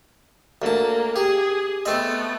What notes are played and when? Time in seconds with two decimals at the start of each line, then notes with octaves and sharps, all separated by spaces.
0.62 D2 A#3 A5
1.16 G4 G#4
1.86 A3 B3 C4 D#5